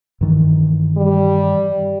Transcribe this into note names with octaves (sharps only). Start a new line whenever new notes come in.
G2 D#3 E3
G3